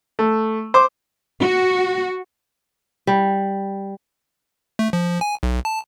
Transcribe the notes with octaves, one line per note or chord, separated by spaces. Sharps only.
A3
C5 D6
F#4
G3
A3
F3
G#5
B1
A5